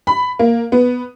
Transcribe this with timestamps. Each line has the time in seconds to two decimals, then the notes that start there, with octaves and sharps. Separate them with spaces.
0.07 B5
0.39 A#3
0.72 B3